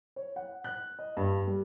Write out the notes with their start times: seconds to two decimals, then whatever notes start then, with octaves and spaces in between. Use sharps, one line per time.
0.16 C#5
0.36 F#5
0.64 F#6
0.99 D#5
1.17 G2
1.47 G3